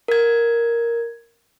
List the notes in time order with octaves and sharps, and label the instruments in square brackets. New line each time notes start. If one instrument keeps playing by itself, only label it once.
[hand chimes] A#4 G#6